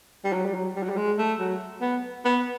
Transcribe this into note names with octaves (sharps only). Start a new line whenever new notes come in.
G3
F#3
G3
F#3
G3
F#3
G3
G#3
A3
F#3
B3
B3